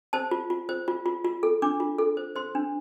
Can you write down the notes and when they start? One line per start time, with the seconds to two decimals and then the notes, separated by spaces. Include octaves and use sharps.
0.13 C5 A5
0.31 F4
0.50 F4
0.69 C5
0.88 F4
1.06 F4
1.25 F4
1.43 A4
1.62 D4 D6
1.80 F4
1.98 A4
2.17 C5
2.36 C5 C6
2.55 D4